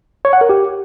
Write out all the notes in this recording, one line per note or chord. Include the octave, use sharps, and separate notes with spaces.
C#5
F#5
A#4
G4